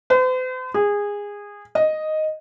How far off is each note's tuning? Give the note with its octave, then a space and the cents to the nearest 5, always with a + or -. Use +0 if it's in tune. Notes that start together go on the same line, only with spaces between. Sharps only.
C5 -45
G#4 -20
D#5 +0